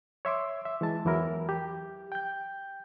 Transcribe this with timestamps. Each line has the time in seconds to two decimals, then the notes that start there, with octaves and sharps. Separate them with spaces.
0.25 C#5 E5 C6 D6
0.65 E5
0.81 E3 G#3 A5
1.05 E2 E3 F#3 E4 A#4
1.49 G4
2.12 G5 G6